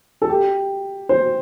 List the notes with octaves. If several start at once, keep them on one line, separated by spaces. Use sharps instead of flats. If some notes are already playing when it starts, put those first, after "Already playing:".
A4
G4
C5